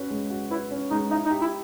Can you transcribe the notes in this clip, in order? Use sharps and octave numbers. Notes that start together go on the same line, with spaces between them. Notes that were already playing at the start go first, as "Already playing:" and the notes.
Already playing: C#4 F#4 B4
G#3
F#4
E4 B4
C#4
G#3 D#4
D#4 E4
D#4
G4
E4